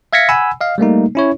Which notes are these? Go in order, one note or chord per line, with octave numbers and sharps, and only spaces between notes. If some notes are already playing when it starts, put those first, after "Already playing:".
E5 F5 G#6 A#6 B6 C#7
F#5 G#5 B5 E6
D#5 F5
G3 A3 A#3 D#4
C#4 E4 C#5